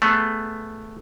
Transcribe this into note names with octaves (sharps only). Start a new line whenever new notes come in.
A3 B3 G#4